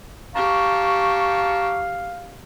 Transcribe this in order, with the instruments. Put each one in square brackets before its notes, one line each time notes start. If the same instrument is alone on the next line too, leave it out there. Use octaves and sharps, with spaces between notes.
[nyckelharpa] G4 [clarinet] F5 [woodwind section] A5 A#5 C#6